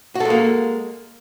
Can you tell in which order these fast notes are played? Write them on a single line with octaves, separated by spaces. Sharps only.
F#4 A4 G#3 A#3